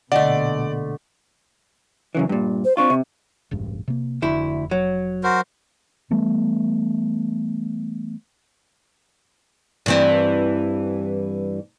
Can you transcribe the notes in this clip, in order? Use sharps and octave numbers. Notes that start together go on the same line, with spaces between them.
A#1 B2 D3 A3 D5 D#5 F#5
F#2 C#3 E3
G2 A#2
C5
C4 D4 F4 C#6
C3
E1 A1 G2
C3 A#3
F1 D2 E4
F#3
F#4 A#4 C5
E3 G3 A3 B3
G2 E3 C4